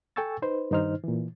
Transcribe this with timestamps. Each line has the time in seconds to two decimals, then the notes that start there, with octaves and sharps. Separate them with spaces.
0.16 A4 G5 G#5 C#6 E6 A6
0.42 D#4 B4 C5
0.71 G2 D#3 D#4 C5 F6
1.04 A#2 E3